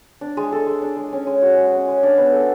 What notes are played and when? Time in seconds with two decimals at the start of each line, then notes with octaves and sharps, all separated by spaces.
0.21 D4
0.37 G#3
0.52 A4
0.67 G#3
0.82 D4
0.96 G#3
1.12 C#4
1.27 G#3
1.42 F#4
1.57 G#3
1.73 C#4
1.88 G#3
2.03 D4
2.18 B3
2.32 A4